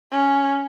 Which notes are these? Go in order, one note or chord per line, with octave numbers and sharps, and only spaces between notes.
C#4